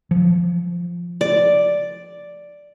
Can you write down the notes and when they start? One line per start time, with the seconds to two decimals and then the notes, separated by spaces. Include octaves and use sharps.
0.11 F3
1.21 D5